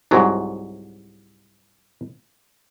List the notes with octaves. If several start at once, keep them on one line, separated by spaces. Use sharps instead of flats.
C2 G#2 F#3